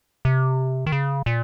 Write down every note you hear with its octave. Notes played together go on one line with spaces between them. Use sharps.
C3
D#3
C#3
A#2